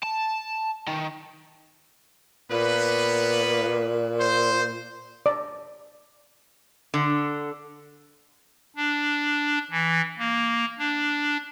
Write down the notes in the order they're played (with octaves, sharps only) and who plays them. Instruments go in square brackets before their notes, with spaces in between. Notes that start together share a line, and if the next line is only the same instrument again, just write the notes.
[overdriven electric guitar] A5
D#3
[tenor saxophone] A#2 [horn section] A#3 B3 B4
[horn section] C5
[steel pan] D5
[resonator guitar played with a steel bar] D3
[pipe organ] D4
E3
A#3
D4